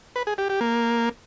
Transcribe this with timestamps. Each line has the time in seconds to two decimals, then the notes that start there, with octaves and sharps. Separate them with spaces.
0.16 B4
0.27 G#4
0.38 G4
0.49 G4
0.61 A#3